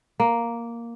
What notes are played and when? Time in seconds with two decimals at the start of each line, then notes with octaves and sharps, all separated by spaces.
0.20 A#3